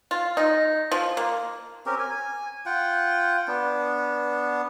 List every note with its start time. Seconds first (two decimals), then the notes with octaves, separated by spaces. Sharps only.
0.11 F4
0.37 D#4
0.92 F3
1.17 A#3
1.86 C4 C#4 G4 A#4
1.99 G#5
2.66 F4 F#5 G5
3.48 B3 D4